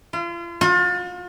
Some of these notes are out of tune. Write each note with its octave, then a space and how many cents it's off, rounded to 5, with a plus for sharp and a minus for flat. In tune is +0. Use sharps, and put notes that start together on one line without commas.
F4 -35
F4 +40